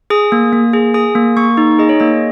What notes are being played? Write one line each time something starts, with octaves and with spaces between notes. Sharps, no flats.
G#4 D#6
A#3
A#3
G#4
G#4 D#6
A#3
A#3 C#6
D#4
G#4 D#5
C#5
A#3 D#5